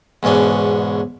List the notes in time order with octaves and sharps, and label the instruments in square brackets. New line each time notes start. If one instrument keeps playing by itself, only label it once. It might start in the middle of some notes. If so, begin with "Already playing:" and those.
[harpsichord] E2 G#2 B2 C#4 D4